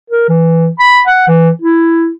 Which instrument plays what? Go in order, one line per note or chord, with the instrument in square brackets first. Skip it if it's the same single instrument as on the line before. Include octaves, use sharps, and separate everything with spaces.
[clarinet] A#4
E3
B5
F#5
E3
E4